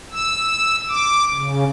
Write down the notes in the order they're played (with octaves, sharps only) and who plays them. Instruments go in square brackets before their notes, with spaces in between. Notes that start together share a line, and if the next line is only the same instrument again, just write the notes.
[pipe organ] E6
D6
C#3